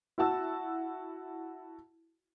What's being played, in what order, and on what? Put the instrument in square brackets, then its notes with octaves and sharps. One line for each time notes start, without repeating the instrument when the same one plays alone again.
[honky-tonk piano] E4 F#4 A5 E6